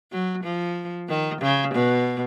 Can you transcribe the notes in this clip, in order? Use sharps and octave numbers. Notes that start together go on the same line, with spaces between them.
F#3
F3
D#3
C#3
B2